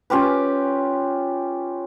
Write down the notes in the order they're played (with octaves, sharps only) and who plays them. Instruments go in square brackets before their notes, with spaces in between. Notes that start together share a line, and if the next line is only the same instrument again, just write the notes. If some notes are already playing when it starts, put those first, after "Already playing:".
[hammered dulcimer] C#4 F4 G4 B4